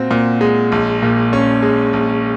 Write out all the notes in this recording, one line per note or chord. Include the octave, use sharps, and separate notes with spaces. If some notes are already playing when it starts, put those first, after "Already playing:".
Already playing: A#2 C4 F#4
A#2
G#3
A#1
A#2
C#4
G#3
A#1